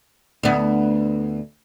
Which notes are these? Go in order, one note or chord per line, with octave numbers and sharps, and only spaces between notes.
D2 B3